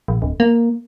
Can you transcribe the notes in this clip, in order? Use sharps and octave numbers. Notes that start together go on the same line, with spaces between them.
A#1
D1
A#3